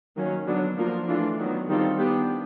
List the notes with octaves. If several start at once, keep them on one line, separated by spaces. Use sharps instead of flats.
D#3 F#3 A#3 C#4
D3 F#3 B3 D4
F3 A#3 D4 F4 A#4
E3 A3 D4 F4
D#3 F#3 B3
D#3 G3 C4 F4 A4
B3 D4 G4